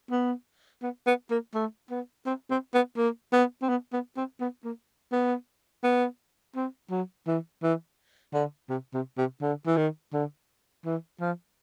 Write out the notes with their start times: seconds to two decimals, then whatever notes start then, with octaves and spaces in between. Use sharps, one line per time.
0.11 B3
0.82 B3
1.06 B3
1.31 A#3
1.54 A3
1.90 B3
2.26 C4
2.50 C4
2.74 B3
2.97 A#3
3.33 B3
3.62 C4
3.69 B3
3.93 B3
4.17 C4
4.40 B3
4.64 A#3
5.12 B3
5.84 B3
6.56 C4
6.90 F#3
7.27 E3
7.63 E3
8.33 D3
8.69 C3
8.94 C3
9.17 C3
9.42 D3
9.67 E3
9.77 D#3
10.13 D3
10.85 E3
11.20 F3